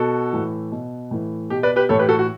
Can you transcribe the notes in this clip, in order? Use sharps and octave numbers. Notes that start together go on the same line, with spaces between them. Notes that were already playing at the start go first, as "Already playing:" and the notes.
Already playing: B2 F#4 A4
A2 E3
B2
A2 E3
B2 G4
B4 D5
G4 B4
A2 E3 A4 C#5
G4 B4
F#4 A4
F#4